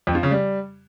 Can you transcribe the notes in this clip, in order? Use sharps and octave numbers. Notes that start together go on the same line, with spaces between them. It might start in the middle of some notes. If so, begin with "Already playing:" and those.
F2
F3
C#3
G3